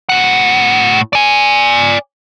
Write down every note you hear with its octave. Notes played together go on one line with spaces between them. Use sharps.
A2 F#5
D5 G#5